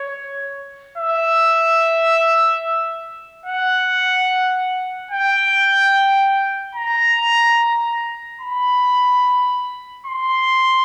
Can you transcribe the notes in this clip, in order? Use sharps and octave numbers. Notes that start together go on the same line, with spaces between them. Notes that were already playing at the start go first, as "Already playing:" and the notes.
Already playing: C#5
E5
F#5
G5
A#5
B5
C6